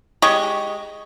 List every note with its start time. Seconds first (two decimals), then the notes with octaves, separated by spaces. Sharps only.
0.22 G#3 G4 D#5 C#6